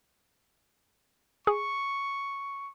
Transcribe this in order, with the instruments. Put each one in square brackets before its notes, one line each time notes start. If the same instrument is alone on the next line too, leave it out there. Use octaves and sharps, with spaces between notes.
[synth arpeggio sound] G#4 [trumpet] C#6